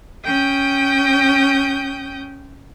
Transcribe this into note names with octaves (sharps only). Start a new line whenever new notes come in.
C#4 G5 D#6 G6